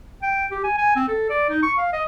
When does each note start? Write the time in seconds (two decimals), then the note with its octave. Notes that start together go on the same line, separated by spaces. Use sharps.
0.23 G5
0.51 G4
0.64 G#5
0.77 G#5
0.96 C4
1.08 A4
1.30 D5
1.49 D#4
1.63 C#6
1.78 F5
1.93 D#5